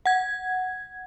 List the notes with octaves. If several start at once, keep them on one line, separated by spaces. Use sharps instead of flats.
F#5 G#6